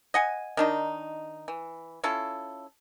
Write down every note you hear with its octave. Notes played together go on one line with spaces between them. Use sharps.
D#5 F#5 G#5
D#3 D4 D#4
E3
C#4 E4 F4 A4